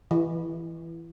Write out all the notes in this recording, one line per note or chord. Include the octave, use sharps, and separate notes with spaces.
E3